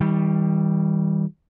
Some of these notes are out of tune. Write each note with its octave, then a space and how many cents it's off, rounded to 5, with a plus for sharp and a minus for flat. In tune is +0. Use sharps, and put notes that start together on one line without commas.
D#3 +45 G3 +0